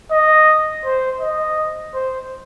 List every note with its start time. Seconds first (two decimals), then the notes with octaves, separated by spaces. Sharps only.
0.12 D#5
0.85 C5
1.21 D#5
1.95 C5